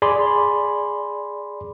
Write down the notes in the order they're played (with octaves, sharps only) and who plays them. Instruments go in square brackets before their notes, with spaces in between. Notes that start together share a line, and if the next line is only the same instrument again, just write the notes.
[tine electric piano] G#4 D5 G#5 B5 C6 D6